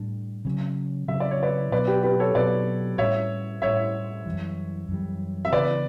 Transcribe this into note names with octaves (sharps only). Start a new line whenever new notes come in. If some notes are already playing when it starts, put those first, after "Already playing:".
Already playing: A2 G3 D4
C#3 F#3 C#4
C#3 F#3 C#4 E5
D5
C#5
B4 D5
B2 F#3 B3 D4 B4 D5
G4 B4
G4 B4
A4 C#5
B2 F#3 B3 D4 B4 D5
A2 G3 C#4 C#5 E5
A2 G3 C#4 C#5 E5
F#2 E3 G3
F#2 E3 G3
E5
C#3 E3 B3 D4 B4 D5